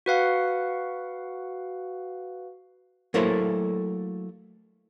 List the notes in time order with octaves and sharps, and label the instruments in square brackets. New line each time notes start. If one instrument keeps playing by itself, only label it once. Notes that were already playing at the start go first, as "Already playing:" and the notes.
[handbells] F#4 B4 F5 F#5
[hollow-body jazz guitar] F#3 A3 A#3 E4 A4 C5